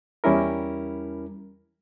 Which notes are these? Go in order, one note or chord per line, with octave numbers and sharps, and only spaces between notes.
E2 G3 C#4 E4 A#4